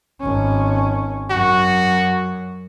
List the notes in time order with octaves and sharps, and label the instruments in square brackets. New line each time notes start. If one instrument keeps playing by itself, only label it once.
[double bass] G#1 C#4
[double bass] F#2 [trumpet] F#4